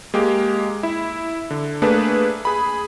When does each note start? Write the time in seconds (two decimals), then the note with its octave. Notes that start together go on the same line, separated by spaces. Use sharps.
0.14 G#3 A#3 G4
0.83 E4
1.51 D3
1.82 A3 A#3 D4 G#4 B4
2.45 G#4 B5